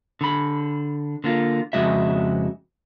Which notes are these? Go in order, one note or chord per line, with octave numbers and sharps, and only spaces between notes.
D3 B5
D3 A#3 F4
F2 C#3 G#3 F#4 E5